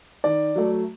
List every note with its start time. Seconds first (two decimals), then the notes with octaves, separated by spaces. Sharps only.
0.24 D#3 D5
0.55 F#3 A3